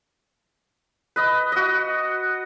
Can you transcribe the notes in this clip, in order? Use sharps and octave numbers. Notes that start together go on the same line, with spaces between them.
B4 D#5
F#4 D#5